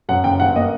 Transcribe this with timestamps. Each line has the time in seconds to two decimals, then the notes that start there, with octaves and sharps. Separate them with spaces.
0.09 F#2 F#5
0.24 F#1 G5
0.40 G2 F#5
0.55 A#3 D#5